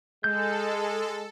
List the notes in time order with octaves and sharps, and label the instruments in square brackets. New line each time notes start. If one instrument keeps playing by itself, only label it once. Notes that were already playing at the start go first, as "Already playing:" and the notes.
[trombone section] G#3 [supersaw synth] A4 [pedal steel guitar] G6